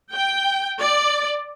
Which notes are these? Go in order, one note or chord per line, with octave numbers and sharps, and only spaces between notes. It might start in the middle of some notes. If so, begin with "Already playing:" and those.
G5
D5